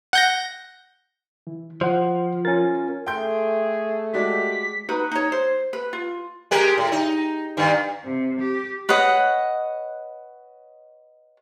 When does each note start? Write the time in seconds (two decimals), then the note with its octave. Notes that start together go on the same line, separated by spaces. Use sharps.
0.13 F#5 G6 A#6
1.47 E3
1.81 F3 C5 F#5
2.45 C#4 F4 A#4 A6
3.06 A3 G#4 G5 C6 G6
4.14 G#3 F#4 G4 D5 B6
4.89 D#4 F#4 B4
5.12 D#4 C#5
5.32 C5
5.73 B4
5.93 F4
6.51 G#3 G4 A#4
6.78 A2
6.92 D#4
7.57 G2 D#3
8.04 C3
8.40 G4
8.89 B4 C#5 D#5 F#5